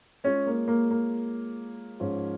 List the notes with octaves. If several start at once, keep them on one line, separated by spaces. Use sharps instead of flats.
G#3 C#4 F4 G#4 C#5
A#3
A#3
A#3
G#2 F3 C#4 F4 C#5